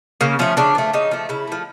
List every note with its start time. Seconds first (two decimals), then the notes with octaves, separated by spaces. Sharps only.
0.21 C#3 A#3
0.39 F3 A3 C#4
0.57 C#3 D4
0.75 F3 A3
0.93 C#3 D#4
1.11 F3 A3
1.29 C#3 E4
1.47 F3 A3